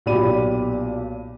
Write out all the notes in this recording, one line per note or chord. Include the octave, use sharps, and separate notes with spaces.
B1 A#2 G4 D5 B5 D#7